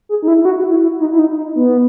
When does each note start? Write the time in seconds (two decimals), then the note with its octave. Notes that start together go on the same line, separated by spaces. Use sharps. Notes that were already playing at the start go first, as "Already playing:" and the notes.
0.09 G#4
0.22 D#4
0.28 E4
0.41 E4
0.45 F#4
0.58 F#4
0.70 E4
0.82 E4
1.00 D#4
1.12 E4
1.19 D#4
1.37 D#4
1.55 B3